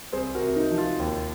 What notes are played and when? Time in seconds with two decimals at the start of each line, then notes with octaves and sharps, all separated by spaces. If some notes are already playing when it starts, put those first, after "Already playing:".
0.13 C2 G#4 C5
0.35 F#4 A#4
0.42 C3
0.56 D#4
0.71 F3
0.78 F4
1.00 D#2